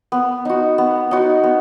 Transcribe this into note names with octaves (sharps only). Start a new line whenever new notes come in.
B3
D#4 F#4
B3
D#4 F#4
B3